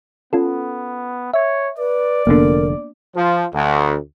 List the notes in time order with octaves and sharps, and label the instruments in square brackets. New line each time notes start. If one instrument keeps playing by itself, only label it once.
[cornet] B3 [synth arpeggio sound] C#4 F4 A4
[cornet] C#5 [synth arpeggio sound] E5
[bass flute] B4 [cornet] D5
[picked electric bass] F1 D3 [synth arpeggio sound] A#3 B3 D4 [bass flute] A#4
[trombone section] F3
D2